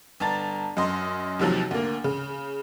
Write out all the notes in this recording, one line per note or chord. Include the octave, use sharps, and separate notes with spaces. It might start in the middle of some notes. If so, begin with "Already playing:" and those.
G1 A5 A#5 A6
F#2 D#5 C6
D#2 C3 F3 F#3
D2 A#3
C#3